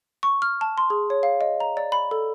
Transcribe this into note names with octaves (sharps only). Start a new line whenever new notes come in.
C#6
F6
A5
C6
G#4
C#5
F5
D#5
A#5
D5
B5
A4